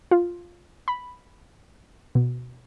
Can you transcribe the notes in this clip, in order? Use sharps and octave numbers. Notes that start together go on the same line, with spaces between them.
F4
B5
B2